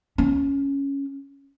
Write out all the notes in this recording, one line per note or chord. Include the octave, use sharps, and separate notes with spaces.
C#4